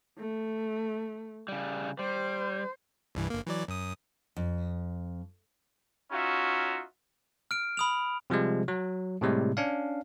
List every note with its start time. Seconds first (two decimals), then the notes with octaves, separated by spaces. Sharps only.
0.18 A3
1.48 C#3 G3
1.99 G3 C5
3.15 C2 G2 E3
3.30 G1 A#3
3.47 E3 F#3 D5
3.68 F#2 D#6
4.36 F2
6.12 C#4 D#4 F4 F#4 E5
7.51 F6 D7
7.77 B5 D#6 F7
8.30 C3 F3 G3 G#3
8.68 F#3
9.21 A2 C3 G3 G#3
9.57 C#4 D4 F5